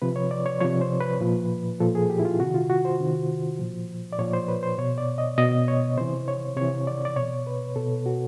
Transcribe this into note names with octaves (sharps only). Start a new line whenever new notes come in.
C3 F3 B4
C#5
D5
C#5
C3 F3 C#5
C5
B4
A#2 F3
A#2 F3 A4
G#4
G4
E4
F4
C3 D#3 F#4
F4
F#4
C5
C3 D#3
A#2 F3
D5
A#2 F3 C#5
C5
B4
C5
B2 C#5
D5
D#5
B2 D#5
C#5
C3 E3 C5
C#5
C3 E3 C#5
D5
D5
B2 C#5
B4
B2 A4
F#4